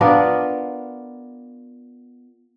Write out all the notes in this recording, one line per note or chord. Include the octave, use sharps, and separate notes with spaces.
B3 D4 F4 A#4